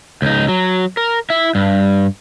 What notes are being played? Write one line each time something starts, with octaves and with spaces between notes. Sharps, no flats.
C#2 D#4
F#3
A#4
E4 E5
G2